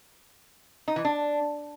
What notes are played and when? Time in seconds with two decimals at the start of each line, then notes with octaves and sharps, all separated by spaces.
0.88 D#4
0.96 E3
1.05 D4